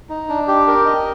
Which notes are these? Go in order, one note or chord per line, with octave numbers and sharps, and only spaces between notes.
D#4
D4
G4
A#4
D#5